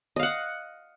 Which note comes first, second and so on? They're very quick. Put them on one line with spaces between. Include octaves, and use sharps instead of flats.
D#5 F5 F#5